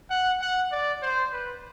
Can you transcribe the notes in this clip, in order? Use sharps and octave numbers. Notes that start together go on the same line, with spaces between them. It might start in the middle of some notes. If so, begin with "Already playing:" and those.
F#5
F#5
D5
C5
B4